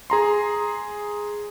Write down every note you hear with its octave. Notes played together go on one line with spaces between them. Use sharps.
G#4 A#5 C6